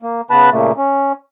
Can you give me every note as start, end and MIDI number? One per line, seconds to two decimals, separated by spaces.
0.02 0.21 58
0.31 0.50 49
0.31 0.50 59
0.31 0.50 71
0.31 0.50 81
0.31 0.50 83
0.31 0.50 90
0.52 0.72 46
0.52 0.72 49
0.52 0.72 57
0.52 0.72 58
0.77 1.12 61